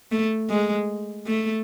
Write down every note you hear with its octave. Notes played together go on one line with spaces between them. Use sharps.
A3
G#3
A3